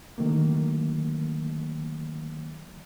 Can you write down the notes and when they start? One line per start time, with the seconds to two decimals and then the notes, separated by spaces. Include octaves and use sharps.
0.18 D3 D#3 F#3 A3 A#3